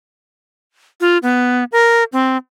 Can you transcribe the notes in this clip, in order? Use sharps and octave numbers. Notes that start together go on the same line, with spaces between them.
F4
B3
A#4
C4